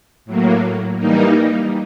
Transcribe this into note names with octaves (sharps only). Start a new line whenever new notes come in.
A2 F#3 A#3
E3 G3 A#3 D#4